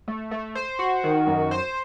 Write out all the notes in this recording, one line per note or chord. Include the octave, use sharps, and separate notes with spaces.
A3
A3
C5
F#4
D#3
F#2
C5